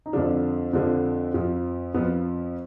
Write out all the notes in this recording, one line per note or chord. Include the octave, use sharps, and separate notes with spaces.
D#4
F2 D3 F3 D4
F2 D3 F3
F2 F3
F2 F3 B3